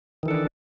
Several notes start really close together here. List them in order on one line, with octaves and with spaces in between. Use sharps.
D#3 E3 A4 D4